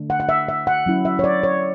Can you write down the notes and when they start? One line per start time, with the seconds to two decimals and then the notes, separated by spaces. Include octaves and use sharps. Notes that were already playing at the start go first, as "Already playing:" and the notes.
Already playing: D3 A3 D4
0.10 F#5
0.20 F#5
0.29 E5
0.48 E5
0.67 F#5
0.86 F#3 C#4 E4
1.05 E5
1.19 C#5
1.24 D5
1.43 C#5